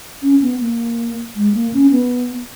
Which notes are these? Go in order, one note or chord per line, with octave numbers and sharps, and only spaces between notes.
C#4
B3
A#3
G#3
A#3
C#4
B3